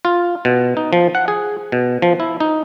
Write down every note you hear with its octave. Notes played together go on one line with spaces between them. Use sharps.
F4
B2
D#4
F3
F#5
G#4
B2
F3
E4
D#4